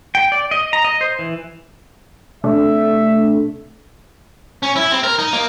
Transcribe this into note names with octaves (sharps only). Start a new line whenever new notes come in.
G5
D5
D#5
A#5
D#5
C5
E3
C3 A3 D4 E5
C#4
E4
C4
A#4
D#4
A#3